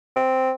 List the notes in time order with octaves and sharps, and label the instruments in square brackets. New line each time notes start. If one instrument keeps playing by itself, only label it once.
[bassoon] C4